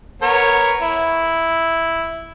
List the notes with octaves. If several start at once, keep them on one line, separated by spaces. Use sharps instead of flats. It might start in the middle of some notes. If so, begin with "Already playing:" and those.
B3 A#4 C#5
E4